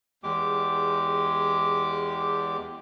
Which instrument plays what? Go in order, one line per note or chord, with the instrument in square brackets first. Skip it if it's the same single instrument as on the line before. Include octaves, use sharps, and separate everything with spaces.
[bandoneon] E2 G#3 G4 D6